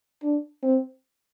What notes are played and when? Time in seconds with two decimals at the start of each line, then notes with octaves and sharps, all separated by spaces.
0.23 D4
0.63 C4